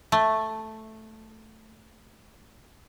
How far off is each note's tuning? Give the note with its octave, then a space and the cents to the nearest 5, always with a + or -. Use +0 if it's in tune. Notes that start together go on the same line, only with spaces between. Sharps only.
A3 +0